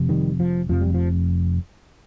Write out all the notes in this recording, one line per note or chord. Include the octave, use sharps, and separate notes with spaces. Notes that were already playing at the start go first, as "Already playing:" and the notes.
Already playing: F1 F2 C3
D#3 G3
F3
F1 F2 C3 F3
G3
F3